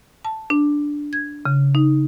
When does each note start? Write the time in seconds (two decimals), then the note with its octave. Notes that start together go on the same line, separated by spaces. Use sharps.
0.25 A5
0.50 D4
1.13 G#6
1.45 C#3
1.75 D#4